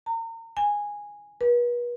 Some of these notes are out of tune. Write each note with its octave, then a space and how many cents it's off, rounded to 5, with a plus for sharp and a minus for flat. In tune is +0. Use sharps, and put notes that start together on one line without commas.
A#5 -35
G#5 -10
B4 -40